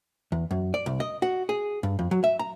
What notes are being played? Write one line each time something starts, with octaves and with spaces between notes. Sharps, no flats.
E2
F#2
D5
C2
D#5
F#4
G#4
G2
F2
F#3
E5
A#5